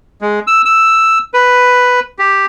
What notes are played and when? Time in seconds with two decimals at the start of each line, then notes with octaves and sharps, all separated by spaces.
0.21 G#3
0.47 E6
0.65 E6
1.34 B4
2.19 G4